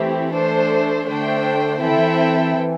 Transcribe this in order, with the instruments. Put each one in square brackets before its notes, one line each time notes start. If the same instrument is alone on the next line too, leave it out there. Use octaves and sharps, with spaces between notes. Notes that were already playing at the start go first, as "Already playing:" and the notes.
Already playing: [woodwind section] E3 [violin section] A3 C4 E4 G4
[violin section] A3 D4 A4 C5
[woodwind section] D3 [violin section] A3 D4 C5 G5
[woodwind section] E3 [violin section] C4 E4 A4 E5 G5
[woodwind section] D3
E3
E3